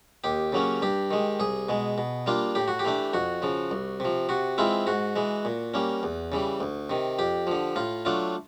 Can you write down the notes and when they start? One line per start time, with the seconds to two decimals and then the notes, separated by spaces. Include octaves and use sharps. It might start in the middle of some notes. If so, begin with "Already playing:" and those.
0.24 D#2 G4
0.53 C#3 F#3 A#3 C#4
0.82 G2 G4
1.11 D#3 G#3
1.40 C2 G#4
1.69 B2 G#3
1.98 B2
2.26 G3 A#3 D4 F4
2.55 A2 G4
2.68 F#4
2.79 G4
2.84 E3 A3 D4
3.13 F2 F#4
3.42 C#3 F3
3.71 C2
4.00 C3 F3
4.29 C3 F#4
4.58 E3 G#3 C4 E4 F4
4.87 G#2 F#4
5.16 E3 G#3
5.45 A#2
5.74 G3 A#3 C#4
6.03 E2
6.32 C#3 E3 G3
6.60 D2
6.90 C3 D#3
7.19 F2 G4
7.47 D3 F3
7.76 A2 F4
8.05 F#3 A3 D4 F4